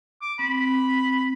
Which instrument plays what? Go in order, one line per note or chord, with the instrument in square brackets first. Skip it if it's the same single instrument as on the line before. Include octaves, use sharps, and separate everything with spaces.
[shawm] D6
[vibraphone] C4 [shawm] B5